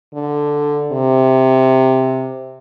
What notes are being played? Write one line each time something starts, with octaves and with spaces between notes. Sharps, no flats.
D3
C3